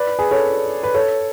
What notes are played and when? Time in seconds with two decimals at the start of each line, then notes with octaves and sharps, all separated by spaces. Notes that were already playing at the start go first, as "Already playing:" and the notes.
Already playing: B4 D5
0.19 G#4 B4
0.31 A4 C#5
0.83 B4
0.94 A4 C#5